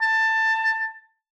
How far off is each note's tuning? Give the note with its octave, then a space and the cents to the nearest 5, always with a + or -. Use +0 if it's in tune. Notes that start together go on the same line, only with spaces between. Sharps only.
A5 +15